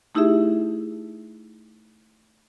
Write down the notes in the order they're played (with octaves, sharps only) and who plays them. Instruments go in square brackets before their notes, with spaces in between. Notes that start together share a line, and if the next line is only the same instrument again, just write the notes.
[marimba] A3 D#4 E4 G4 G#4 E5